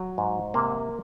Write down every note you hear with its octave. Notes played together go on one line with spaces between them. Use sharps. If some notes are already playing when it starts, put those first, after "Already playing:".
Already playing: F#3
G#2
C3 A#3